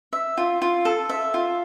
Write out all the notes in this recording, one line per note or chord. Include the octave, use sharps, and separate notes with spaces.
E5
F4
F4
A4
E5
F4